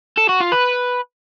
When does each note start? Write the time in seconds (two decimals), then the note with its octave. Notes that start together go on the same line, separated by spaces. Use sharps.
0.17 A4
0.29 F#4
0.40 F4
0.52 B4